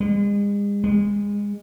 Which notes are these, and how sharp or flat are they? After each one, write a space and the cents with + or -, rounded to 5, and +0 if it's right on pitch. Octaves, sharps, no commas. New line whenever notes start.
G#3 -40
G#3 -25